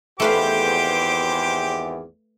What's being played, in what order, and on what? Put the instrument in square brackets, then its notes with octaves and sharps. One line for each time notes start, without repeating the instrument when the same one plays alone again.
[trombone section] G#1 E2 [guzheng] A3 B4 F5 [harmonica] G4 C5 D6